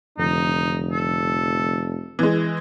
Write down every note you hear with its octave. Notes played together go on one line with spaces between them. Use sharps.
F1 F2 D3 F3 D#4
A4
E3 G#3